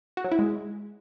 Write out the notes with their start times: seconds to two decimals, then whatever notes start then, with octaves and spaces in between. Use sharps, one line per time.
0.17 F#4
0.24 F#3
0.32 E4
0.39 G#3